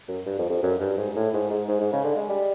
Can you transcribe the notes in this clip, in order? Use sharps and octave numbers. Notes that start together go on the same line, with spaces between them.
F#2
G2
F2
F2
F#2
G2
G#2
A2
G#2
G#2
G#2
G#2
C#3
D3
G#3
G3